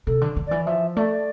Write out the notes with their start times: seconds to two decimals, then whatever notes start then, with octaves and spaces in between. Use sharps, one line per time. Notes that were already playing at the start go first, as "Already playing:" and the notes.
0.07 C3 A4
0.21 D3
0.36 D3
0.47 E3 D5
0.66 F3 E5
0.96 A3 D5